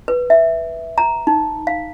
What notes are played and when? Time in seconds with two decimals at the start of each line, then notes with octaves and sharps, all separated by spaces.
0.08 B4
0.30 E5
0.98 A#5
1.27 D#4
1.67 F5